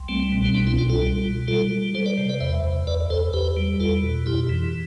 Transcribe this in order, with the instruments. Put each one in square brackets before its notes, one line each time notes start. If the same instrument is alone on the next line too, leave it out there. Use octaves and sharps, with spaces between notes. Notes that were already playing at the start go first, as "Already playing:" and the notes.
Already playing: [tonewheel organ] C2
G3 A3 C4
B2
C4
C2 B3 D4
C4 E4
C2 D4 F4
F4 A4
G3
B2
G3 F4 A4
G3
G3 A4 C5
B4 D5
C3
B4 D5
E2 C5 E5
E2
E2 B4 D5
E2 A4 C5
E2 G4 B4
G3
E2 F4 A4
B2
F2 E4 G4
E3